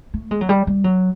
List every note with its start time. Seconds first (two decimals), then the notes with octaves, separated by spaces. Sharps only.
0.14 A3
0.31 G#3
0.41 F#3
0.49 G3
0.67 G3
0.84 F#3